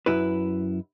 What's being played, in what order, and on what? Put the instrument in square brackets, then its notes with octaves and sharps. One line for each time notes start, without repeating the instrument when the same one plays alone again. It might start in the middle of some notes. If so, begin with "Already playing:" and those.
[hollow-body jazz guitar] F#2 E4 B4